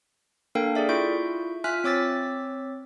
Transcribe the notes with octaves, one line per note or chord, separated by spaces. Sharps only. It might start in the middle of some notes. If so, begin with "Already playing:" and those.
A#3 D4 A4 A#4 F5 G5
G#4 A4 D5 E5
E4 F4 E5 C#6 G6 D7
F4 E5 G#5 F6 F#6 B6
C4 C#5 D6 E6 A6 B6